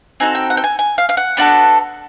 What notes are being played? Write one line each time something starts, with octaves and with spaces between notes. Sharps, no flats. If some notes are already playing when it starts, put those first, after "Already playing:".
C4 D#4 F#4 A4 G#5
G5
F#5
G5
G#5
G#5
F5
F5
F#5
B3 D4 F#4 A4